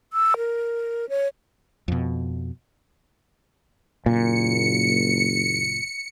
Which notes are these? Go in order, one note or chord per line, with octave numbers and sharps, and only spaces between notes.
E6
A#4
C#5
F2 B2
F#1 A#2 C#7